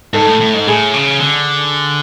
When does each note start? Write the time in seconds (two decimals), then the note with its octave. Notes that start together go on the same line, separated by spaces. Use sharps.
0.13 G#2 A4 A5
0.27 A2
0.40 A2
0.54 G#2
0.67 A2 G#4 G#5
0.94 C#3
1.20 D3